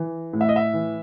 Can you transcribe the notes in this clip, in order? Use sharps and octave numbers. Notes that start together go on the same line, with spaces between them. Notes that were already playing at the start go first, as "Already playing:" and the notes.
Already playing: E3
A2
E5
D#5
E5
E3